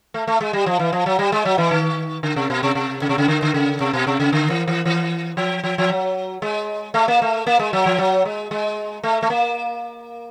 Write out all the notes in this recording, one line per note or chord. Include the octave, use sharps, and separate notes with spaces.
A3
A3
G#3
G3
F3
E3
F3
F#3
G3
G#3
F#3
E3
D#3
D3
C3
B2
C3
C3
C#3
C3
C#3
D3
D3
C#3
C3
B2
C3
C#3
D3
E3
E3
E3
F3
F3
F3
F#3
G#3
A3
A#3
A3
A#3
G#3
F#3
F3
F#3
G#3
G#3
A3
A3
A#3